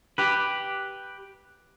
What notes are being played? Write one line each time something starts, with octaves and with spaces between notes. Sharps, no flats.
G4 B4